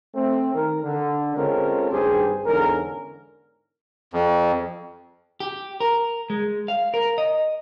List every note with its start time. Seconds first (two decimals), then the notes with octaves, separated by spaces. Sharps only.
0.15 A3 C4
0.54 D#3 A#4
0.84 D3
1.36 G#3 C4 C#4 F4 A4 A#4
1.92 G#1 D2 G2 G4 G#4 C5
2.46 E2 G#2 D3 C#4 A#4
4.13 F2
5.40 G4
5.80 A#4
6.30 G#3
6.68 F5
6.94 A#4
7.18 D#5